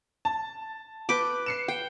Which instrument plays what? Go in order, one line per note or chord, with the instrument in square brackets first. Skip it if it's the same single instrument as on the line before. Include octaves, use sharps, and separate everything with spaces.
[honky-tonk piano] A5
[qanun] B4 G5 D6
[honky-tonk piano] C7 C#7 E7
[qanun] G5